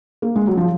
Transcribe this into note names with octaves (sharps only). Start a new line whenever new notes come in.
A#3
G#3
F#3
F3